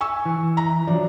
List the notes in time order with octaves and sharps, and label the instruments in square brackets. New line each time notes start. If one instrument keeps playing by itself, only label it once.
[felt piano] G#5 C#6 E6
[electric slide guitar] E3
[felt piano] A#5
[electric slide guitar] F3 F#3 [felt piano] D4